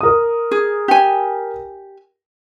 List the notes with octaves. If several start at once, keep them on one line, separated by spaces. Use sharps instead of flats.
A#4 D#6
G#4
G4 G#5